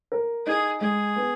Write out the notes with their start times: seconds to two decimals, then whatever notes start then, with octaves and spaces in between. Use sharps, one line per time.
0.12 A#4
0.46 D#4 G#4
0.81 G#3 G#4
1.16 B3